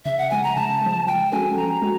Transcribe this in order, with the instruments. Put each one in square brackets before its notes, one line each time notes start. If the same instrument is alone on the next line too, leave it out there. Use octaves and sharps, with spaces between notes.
[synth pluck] C#3 [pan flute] E5
[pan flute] F#5
[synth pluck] F3 G#3 [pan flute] G#5
[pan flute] A#5
[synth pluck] C#3 [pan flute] A5
[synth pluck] F3 G#3
[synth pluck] F3 [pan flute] G5
[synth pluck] G#3 C#4 F#4 A4 [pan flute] G#5
[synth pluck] F3 [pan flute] A#5
[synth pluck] G#3 F#4